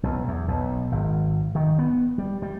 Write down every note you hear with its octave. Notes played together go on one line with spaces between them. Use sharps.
B1
E2
B1
G#1
D#3
B3
G3
G3